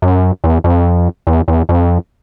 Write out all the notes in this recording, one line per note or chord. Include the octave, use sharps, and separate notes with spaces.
F#2
E2
F2
E2
E2
F2